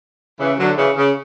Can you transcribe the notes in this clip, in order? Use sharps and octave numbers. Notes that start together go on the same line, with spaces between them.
C#3 E3
D3 F#3
C#3 E3
C#3